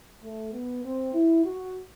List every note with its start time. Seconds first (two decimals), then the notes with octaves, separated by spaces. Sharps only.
0.22 A3
0.53 B3
0.84 C4
1.13 E4
1.44 F#4